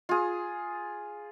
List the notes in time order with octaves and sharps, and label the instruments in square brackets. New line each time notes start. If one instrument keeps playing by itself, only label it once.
[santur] F4 G#4